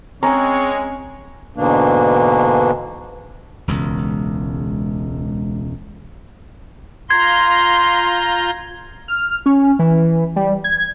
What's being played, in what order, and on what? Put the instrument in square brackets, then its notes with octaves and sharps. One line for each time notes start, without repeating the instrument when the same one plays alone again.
[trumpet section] G#3 C#5 [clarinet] C4 [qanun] C#4 [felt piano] A#5
[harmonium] G#2 B2 D3 E3 A#3 D4
[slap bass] E1 C#2
[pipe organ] F4 A#5 G6 [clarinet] C6 [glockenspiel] G#6
[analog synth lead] F6
C#4
E3
G3
G#6